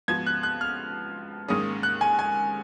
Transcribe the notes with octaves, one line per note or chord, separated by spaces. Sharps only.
G#2 F3 B3 F#4 G#6
F#6
F#6
F6
G#2 D#3 A#3 C#4 G#4 D#6
F#6
G#5
G#5